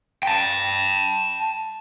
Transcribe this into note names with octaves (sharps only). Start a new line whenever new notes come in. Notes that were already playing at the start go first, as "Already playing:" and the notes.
G5 A5